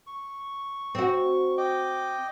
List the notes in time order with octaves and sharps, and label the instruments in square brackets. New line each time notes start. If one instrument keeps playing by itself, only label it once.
[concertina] C#6
[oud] C4 F#4
[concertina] D#5 G5 D6